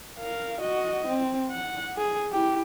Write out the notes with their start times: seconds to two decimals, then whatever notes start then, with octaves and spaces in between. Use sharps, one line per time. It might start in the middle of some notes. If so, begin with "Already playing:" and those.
0.19 A#4 F5
0.61 F#4 D#5
1.07 C4
1.51 F#5
1.97 G#4
2.32 E4 G4